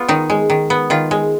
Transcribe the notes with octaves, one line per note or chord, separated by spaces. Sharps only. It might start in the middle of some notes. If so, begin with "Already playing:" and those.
Already playing: B3 F4
D#3 D#4
G#3
D#3
B3
D#3 F4
G#3